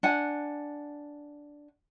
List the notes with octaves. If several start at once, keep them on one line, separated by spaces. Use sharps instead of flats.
D4 F#5 G#5